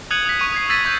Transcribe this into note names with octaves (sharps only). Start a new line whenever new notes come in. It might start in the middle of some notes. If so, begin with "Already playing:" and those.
D#6 F#6 G#6 C#7 D#7 F#7
D#6 F#6 B6
C#6 D#7
D#6 G#6 C7
E6 G#6 A6 B6 D#7
C#6 G6